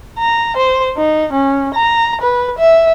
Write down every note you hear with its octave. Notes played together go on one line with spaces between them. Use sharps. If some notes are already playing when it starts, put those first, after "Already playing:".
A#5
C5
D#4
C#4
A#5
B4
E5